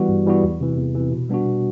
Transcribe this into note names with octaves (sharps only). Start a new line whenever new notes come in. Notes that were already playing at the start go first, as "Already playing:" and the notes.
Already playing: E3 G3 B3 F#4
G2
E3 G3 B3 F#4
E2
C3 E3
E2
C3 E3
B2
G3 B3 D4 F#4
B2